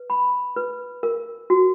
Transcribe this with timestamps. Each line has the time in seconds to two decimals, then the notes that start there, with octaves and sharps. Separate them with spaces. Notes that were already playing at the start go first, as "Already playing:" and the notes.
Already playing: B4
0.10 B5
0.56 B4
1.03 A#4
1.50 F#4